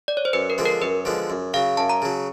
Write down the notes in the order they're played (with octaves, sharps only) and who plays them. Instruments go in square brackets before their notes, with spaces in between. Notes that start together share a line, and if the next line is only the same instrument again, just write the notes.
[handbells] D5
C#5
C5
[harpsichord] F#2 [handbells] B4
[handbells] A#4
[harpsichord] D3 F3 G#3 B3
[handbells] A#4
[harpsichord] F#2 [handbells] B4
[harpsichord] D3 F3 G#3 B3
F#2
[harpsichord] C#3 F#3 [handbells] F5
[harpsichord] F#2 [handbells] A5
[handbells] A#5
[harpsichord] C#3 F#3